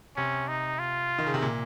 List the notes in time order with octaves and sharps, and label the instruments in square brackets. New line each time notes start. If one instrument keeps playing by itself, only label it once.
[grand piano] C3 [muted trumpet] C#4
[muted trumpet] D#4
F4
[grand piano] D#3
C#3
C3
A#2